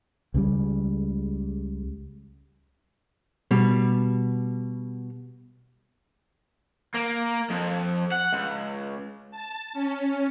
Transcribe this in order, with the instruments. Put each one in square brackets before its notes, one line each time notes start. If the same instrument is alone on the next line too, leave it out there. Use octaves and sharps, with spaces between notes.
[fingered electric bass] C#2 C#3 G3
[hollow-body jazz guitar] B2 G3
[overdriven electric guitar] A#3
F2
F#5
C#2
[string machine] A5
C#4